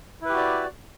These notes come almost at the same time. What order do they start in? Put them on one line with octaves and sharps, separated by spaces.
E4 B4 G4 F#4 D5